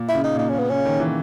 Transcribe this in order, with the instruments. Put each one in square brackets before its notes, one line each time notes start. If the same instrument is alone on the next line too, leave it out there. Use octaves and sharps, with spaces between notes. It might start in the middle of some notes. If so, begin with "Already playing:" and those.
Already playing: [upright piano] A#2
[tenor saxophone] E4
[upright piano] C#3
[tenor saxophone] D#4
[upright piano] A#2 [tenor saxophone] D#4
[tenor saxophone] C#4
[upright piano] C#3 [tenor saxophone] B3
[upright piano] C#3 [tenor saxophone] C#4
[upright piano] D#3
E3